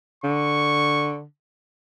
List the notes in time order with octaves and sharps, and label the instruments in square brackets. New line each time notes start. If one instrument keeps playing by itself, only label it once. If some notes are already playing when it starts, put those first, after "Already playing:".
[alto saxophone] D3 [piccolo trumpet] C#6